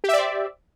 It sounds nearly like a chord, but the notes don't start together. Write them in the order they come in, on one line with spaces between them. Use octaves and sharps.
G4 E5 D5 C5